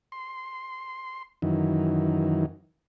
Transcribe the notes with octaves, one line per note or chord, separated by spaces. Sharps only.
C6
F#2 D#3 E3